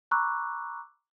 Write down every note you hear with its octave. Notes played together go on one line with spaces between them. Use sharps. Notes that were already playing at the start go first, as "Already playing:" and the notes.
A#5 B5 C#6 D6 E6 F#6